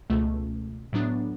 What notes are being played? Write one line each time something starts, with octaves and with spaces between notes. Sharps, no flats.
C#2 B2 A3
A2 F#3 B3 D4